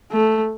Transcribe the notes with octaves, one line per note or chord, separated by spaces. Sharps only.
A3